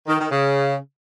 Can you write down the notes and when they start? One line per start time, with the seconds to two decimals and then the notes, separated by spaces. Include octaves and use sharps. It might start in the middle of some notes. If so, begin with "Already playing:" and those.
0.07 D#3
0.19 D#3
0.31 C#3